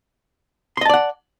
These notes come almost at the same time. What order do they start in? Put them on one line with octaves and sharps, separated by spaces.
C6 D#5 A5 D5 F#5